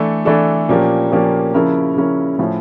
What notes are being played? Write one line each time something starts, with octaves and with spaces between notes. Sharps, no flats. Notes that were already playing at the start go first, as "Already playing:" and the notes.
Already playing: E3 A3 D4 A4
E3 A3 D4 A4
A#2 F3 A#3 C#4 G4
A#2 F3 A#3 C#4 G4
C#3 F3 C#4 E4 A#4
C#3 F3 C#4 E4 A#4
A2 F3 C#4 E4